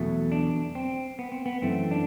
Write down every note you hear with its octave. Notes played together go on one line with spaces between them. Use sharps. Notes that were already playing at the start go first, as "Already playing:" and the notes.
Already playing: E2 B2 F#3 A3
D4
C4
B3
C4
B3
F#2 E3 A3 C4
D4